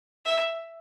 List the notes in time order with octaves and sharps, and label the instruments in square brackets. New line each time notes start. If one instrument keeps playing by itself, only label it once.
[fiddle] E5